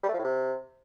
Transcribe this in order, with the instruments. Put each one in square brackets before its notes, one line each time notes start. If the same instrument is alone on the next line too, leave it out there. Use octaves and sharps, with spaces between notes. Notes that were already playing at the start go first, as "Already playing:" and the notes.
[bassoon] G3
A3
F3
A2
C3